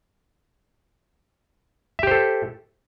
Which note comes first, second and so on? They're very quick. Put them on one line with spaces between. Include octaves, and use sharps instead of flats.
E5 G4 C5 A4